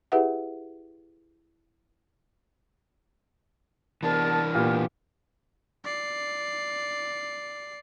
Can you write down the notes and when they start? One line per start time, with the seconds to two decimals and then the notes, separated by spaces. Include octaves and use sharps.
0.12 E4 G4 G#4 B4 E5 F#5
4.03 C2 E3 B3 D4 A#4 A5
4.55 A#2 B3 G4
5.84 D5 C7